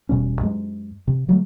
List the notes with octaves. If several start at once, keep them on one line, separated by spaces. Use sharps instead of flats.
E1 B2 G3 C#4
F#2 G#3
C3
D3 F#3 G3 A3